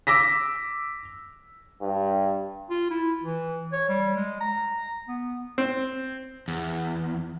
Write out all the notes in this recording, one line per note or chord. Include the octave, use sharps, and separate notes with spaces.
D6 E6 A#6 B6
G2
F4
E4
E3
C#5
G3
G#3
A#5
B3
C4
E2